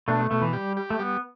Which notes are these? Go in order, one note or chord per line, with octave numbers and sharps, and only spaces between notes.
B2 A3 D4
A3
B2 A3
E3
G3 G4
G4
A3
G3 B3